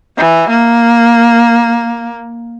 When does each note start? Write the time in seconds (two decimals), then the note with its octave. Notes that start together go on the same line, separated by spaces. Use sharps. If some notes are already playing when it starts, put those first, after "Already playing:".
0.17 E3
0.49 A#3